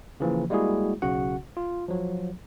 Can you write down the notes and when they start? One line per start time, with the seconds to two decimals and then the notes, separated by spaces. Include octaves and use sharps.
0.20 C#3 E3 F3 A#3
0.50 G3 G#3 A#3 E4 F#4 G#4
1.02 B1 C#3 C#4 F#4 F#5
1.57 F4
1.88 F3 F#3